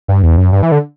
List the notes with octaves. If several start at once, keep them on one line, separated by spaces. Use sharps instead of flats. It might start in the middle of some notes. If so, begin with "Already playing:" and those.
G2
E2
F#2
G2
E3
D3